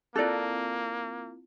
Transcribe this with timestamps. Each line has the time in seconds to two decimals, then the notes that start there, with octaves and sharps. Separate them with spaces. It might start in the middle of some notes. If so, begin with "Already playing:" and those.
0.15 A#3 C4 E4 F4 A4 D5